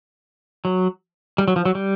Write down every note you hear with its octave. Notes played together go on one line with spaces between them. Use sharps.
F#3
G3
F#3
F3
F#3
G3